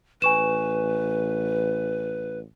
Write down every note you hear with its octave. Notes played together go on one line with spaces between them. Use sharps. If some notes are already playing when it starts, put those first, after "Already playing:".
A1 B4 G#5 C#6 E7